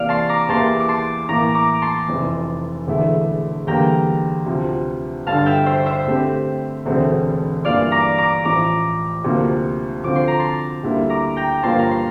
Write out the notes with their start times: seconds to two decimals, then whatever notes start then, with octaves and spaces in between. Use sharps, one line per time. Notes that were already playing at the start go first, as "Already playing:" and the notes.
Already playing: C3 E3 A#3 D5 F5
0.09 A5 C6
0.29 A#5 D6
0.49 E2 E3 A#3 E4 G4 A5 C6
0.80 D6
0.88 A5 C6
1.29 A2 E3 A#3 A#5 D6
1.55 A#5 D6
1.82 A5 C6
2.08 F1 F2 E3
2.87 E1 E2 D3 A3 E4
3.67 E2 D3 G3 A#3 G5 A#5
4.46 D2 C3 F3
5.26 G1 G2 D3 F5 A5
5.46 E5 G5
5.66 C5 E5
5.86 C5 E5
6.07 D3 A3 C4 G4
6.86 E1 D2 D3 A3 C4
7.65 G2 E3 A#3 F4 D5 F5
7.92 A#5 D6
8.18 A#5 D6
8.45 A1 A2 F3 A#5 D6
9.24 D2 C3 F3 A#3
10.04 D3 F3 C4 F4 C5 D6
10.16 C6
10.28 A#5
10.39 A5 C6
10.84 D2 D3 G3 A#3 E4
11.10 A#5 D6
11.37 G5 A#5
11.63 G1 G2 F3 A#3 F4 A5 C6
11.79 A#5
11.91 C6